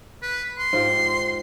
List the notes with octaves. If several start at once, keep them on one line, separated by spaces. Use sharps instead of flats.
B4
C6
G#2 F4 G4